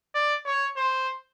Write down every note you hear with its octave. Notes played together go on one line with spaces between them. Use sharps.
D5
C#5
C5